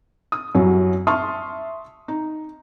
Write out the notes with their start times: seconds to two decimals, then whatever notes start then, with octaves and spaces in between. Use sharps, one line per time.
0.32 D#6
0.55 F#2 F#3 G3 E4
1.07 E5 A5 C6 C#6 D#6 F6
2.08 D#4